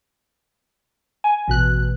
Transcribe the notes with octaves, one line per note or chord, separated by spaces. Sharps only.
G#5
A1 B2 F#6